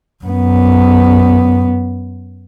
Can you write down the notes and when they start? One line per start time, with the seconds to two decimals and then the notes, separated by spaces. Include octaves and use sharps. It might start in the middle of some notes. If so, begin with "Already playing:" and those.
0.24 F#2 B3